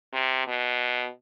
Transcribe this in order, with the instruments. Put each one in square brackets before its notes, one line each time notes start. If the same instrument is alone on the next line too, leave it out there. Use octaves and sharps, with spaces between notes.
[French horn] C3
B2